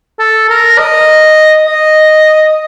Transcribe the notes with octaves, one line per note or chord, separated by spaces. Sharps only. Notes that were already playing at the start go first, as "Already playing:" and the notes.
A4
A#4
D#5
D#5